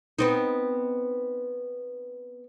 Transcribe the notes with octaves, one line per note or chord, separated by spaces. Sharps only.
B3 C4 D#4